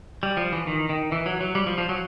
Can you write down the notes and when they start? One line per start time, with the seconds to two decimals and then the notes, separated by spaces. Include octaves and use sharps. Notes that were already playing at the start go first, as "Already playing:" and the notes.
0.23 G3
0.37 F3
0.52 E3
0.67 D#3
0.89 D#3
1.12 E3
1.26 F#3
1.41 F#3
1.55 G3
1.66 F3
1.78 F3
1.89 F#3